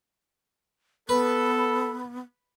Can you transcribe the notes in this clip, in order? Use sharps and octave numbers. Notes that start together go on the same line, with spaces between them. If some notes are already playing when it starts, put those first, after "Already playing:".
B3 A4 B4